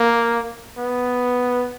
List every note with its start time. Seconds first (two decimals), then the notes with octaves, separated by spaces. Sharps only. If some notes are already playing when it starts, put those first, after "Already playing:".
Already playing: A#3
0.78 B3